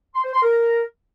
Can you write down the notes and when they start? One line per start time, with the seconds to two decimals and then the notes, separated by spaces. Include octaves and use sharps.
0.15 C6
0.24 C5
0.33 C6
0.43 A#4